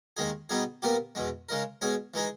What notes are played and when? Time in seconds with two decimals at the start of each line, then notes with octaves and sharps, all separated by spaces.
0.17 D#2 D#3 G#3 D#4 G#4
0.49 B2 G3 B3 D#4 G#4
0.82 A#2 G3 B3 G4 A#4
1.15 E2 B2 G#3
1.49 C#3 G#3 D#4 A#4
1.81 B2 G#3 C#4 G#4
2.14 E3 G#3 D#4 G#4